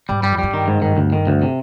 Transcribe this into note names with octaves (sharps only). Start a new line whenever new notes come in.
G#2 G3
G2 G3
F2
G2 G3
D#3
G#2
D#3
D2
D#3
D2
C3